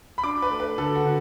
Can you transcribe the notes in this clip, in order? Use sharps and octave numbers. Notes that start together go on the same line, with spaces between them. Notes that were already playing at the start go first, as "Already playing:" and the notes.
B5
D4 D6
B4
A3
B4
D3 A4
F#4
D3